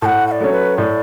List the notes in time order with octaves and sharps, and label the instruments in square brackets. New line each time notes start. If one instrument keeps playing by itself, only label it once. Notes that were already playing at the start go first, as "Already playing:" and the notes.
[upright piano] A2 [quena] F#5 A5
[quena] F#5
D5
[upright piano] F#3 A3 C#4
[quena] B4
[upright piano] A2 [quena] D5